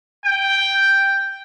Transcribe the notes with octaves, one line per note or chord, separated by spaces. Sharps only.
G5